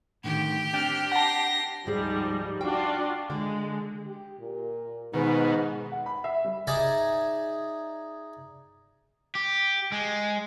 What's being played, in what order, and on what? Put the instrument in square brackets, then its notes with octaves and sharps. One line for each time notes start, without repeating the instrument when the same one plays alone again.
[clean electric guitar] A2 D3 D#3 [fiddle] G4
[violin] C4 F6 [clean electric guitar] D4 [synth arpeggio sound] G5
[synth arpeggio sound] F#5 A5 [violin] A#6 C7
[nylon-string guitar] D2 G#2 G#4 [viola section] F3 G3 D#4
[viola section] D4 F4 F#4 [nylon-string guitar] G5
[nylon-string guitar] D3 [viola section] G#3
[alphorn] G4
A#2
[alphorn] G#2 [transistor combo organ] B2 D#3 [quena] B4
[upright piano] F#5
B5
E5
G3
[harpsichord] D#4 G#4 D5 E5
[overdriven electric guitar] G4
G#3